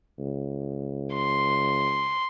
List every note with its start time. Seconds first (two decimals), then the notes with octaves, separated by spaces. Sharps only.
0.19 C#2
1.15 C6